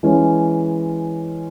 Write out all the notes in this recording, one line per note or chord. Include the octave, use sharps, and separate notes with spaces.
E3 G#3 C#4